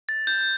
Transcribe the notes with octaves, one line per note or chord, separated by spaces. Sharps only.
A6
G6